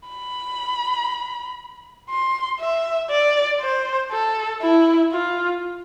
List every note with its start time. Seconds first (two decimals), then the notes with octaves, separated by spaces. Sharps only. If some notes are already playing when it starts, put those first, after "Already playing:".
0.09 B5
2.10 C6
2.60 E5
3.10 D5
3.61 C5
4.12 A4
4.62 E4
5.12 F4